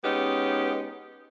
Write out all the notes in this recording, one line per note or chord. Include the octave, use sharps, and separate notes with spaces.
G#3 B3 C#4 D#4 G4